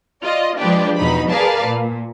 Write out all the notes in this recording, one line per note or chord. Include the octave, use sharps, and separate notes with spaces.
F4 D5 D#5
F3 G#3 D4 G4 B4
E2 B2 D#4 B5
G#4 A#4 B4 D5 F5 A5
A#2